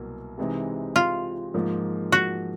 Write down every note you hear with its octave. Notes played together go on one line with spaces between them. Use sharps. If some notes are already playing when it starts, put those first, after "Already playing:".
Already playing: C2 B2 F#3 A#3
C3 E3 G#3 C4 D#4
F4
G#2 F3 A#3
F#4